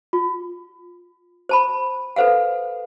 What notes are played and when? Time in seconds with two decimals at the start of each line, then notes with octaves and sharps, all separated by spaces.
0.13 F4
1.49 C5 A5 B5
2.16 A4 B4 C5 F5 F#5